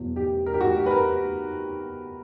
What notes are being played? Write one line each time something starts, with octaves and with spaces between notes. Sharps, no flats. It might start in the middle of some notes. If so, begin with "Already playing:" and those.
Already playing: E2 B2 F#3
G4
A#4
G4
F#4
G4
B4
A#4